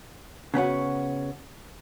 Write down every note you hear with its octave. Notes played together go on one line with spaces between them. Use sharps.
C#3 B3 C#4 F#4